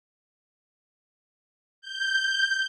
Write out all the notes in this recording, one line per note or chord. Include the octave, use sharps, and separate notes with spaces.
G6